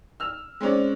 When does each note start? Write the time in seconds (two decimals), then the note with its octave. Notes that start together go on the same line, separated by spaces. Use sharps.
0.20 E6 F6
0.61 G#3 C4 C#4 D5